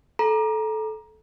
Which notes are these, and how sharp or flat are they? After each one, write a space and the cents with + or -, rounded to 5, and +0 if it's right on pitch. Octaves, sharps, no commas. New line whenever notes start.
A4 -15 A#5 +20